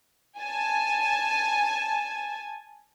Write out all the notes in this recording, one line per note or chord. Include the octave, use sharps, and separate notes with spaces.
G#5 A5